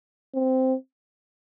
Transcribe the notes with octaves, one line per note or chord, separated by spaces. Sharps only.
C4